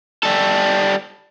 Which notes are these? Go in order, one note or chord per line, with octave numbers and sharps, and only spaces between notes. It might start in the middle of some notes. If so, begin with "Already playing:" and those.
G3 A4